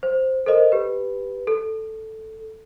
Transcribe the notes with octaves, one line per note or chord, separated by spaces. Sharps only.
C5
A4 A#4 C5 D#5
G4 B4
A4